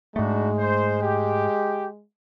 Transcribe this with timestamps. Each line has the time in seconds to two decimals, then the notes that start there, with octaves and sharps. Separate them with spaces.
0.16 G#2 G#3 A3 D4 D#4 F#4
0.58 C5
1.02 G4